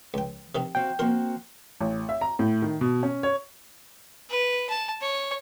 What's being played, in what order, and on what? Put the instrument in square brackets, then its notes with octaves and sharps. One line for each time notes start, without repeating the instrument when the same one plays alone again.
[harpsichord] C#2 G5
C3 D#3 D#4
[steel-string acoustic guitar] C4 F#4 F5 [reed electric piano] G5
[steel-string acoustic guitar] A#3 C4 F#4 [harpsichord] A#4 C6
[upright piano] A1
E5
A#5
A2
D#3
B2
C#4
C#5
[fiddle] B4
A5
C#5